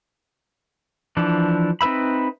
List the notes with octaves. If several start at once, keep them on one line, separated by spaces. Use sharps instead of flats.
E3 F3 D4
C4 D#4 B4 E5 B5